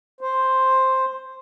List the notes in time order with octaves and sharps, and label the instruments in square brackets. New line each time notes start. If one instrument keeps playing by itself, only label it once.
[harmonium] C5